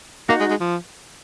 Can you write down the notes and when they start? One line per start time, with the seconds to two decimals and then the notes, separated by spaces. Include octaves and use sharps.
0.29 A#3 D#4 F#4
0.40 G#3
0.50 G#3
0.60 F3